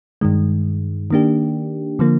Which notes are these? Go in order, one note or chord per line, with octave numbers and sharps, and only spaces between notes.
G2 D#3 G#3
D#3 A#3 D4 G4
D3 F3 A#3